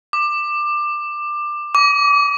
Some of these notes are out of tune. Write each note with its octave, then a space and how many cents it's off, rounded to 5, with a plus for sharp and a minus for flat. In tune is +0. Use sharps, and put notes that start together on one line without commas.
D6 +20
D6 -30